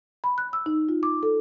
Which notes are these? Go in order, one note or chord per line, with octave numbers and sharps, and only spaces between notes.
B5
F#6
E6
D#4
F4
D6
A4